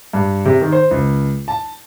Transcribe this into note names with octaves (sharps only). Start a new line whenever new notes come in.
G2
C3
D#3
C5
C#2
A5